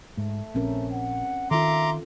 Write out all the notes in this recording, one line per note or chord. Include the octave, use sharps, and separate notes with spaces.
G#2 A3
A#1 C4 C#4 A#4
F#5
D#3 F4 A4 E5 A#5 C6 D6